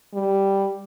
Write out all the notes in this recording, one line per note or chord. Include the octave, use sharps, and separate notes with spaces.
G3